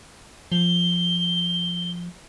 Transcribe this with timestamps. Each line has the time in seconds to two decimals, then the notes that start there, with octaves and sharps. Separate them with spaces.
0.52 F3 G7